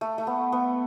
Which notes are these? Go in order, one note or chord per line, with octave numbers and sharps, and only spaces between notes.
A3
A3
B3
B3